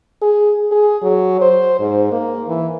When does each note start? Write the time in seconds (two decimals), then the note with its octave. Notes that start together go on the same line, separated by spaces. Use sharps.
0.22 G#4
0.71 G#4
1.03 F#3
1.41 C5
1.80 G#2
2.12 A#3
2.48 E3